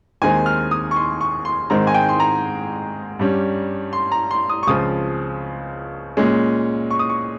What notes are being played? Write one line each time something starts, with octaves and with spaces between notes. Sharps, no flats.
D#2 D#3 G#3 C4 G#5
F6
D#6
C#6
C6
C#6
C6
G#2 D#3 G#3 C4 A#5
G#5
G5
C6
A#5
G2 G3 C#4
C6
A#5
C6
D#6
C#6
C#2 C#3 F3 C4 D#6
A#2 G#3 C#4
C#6
D#6
C#6